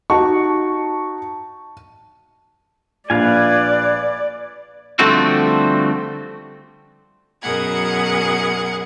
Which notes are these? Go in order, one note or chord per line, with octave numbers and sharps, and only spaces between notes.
D#4 F#4 A5 C#6
A#1 B4 D5 F5 G#5
D3 F3 G3 A3 C4 F#4
F#2 B2 G#4 A#4 F#5 G#6